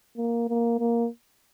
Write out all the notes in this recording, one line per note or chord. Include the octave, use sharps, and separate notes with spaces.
A#3
A#3
A#3